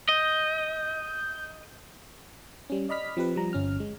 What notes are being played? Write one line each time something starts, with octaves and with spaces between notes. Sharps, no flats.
D#5 G6
G3 C#4
D5 D#5 B5 F6 B6
F3 C4 G4 B4
F3 G3 A#5
G1 C#4 F6
G#3